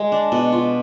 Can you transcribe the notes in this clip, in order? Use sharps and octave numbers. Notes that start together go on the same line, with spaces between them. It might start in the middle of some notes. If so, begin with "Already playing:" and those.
Already playing: G#3
D4
B2
F4